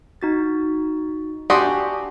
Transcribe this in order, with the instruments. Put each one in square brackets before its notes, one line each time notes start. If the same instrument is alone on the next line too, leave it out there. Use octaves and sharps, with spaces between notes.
[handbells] D#4 F#4 A6
[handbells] D4 G#5 [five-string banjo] F#4 [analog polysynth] G4 [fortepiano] D5 C6 D#6